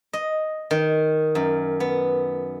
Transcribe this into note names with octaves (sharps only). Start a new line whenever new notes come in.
D#5
D#3
F#2
B3